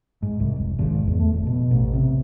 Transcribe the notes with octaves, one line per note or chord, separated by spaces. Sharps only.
G#2
C2
F1
G#1
E2
A3
F1
B2
A1
C3